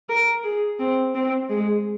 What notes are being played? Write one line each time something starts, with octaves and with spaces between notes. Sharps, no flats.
A#4
G#4
C4
C4
G#3